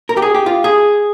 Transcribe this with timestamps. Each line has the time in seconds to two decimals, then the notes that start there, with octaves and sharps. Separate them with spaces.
0.09 A#4
0.17 G4
0.22 G#4
0.35 G4
0.46 F4
0.64 G#4